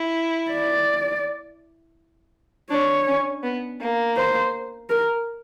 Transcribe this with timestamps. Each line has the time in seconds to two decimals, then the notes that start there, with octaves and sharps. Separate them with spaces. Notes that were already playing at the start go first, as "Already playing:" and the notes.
Already playing: E4
0.51 D5
2.70 D4 C#5
3.07 C#4
3.43 B3
3.80 A#3
4.17 C5
4.90 A#4